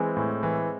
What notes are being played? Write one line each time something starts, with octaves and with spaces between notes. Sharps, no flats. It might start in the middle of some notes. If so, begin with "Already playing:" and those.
Already playing: E3 G#3 C4
A2
E3